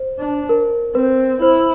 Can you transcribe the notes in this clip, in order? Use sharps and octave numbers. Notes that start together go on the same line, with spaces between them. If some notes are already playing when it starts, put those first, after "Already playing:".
Already playing: C5
D4
A#4
C4 B4
E4 C5